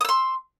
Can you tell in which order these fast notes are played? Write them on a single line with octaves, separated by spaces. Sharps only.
D#6 E6 C6